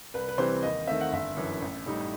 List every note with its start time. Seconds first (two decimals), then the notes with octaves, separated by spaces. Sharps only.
0.14 C2 B4
0.29 B4
0.38 C3 E3 G3 C4 C5
0.63 D#2 D#5
0.87 D#3 A3 C4 E5
1.01 F#5
1.12 G1 E5
1.37 F#2 E3
1.62 A1
1.86 A2 G3 D#4